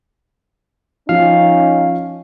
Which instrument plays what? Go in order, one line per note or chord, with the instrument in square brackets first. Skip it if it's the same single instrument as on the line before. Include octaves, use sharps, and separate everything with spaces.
[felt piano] F3 [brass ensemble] C#4 D#4 [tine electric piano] F5